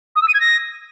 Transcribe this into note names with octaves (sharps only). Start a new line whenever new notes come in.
D#6
E6
D#7
G#6
A#6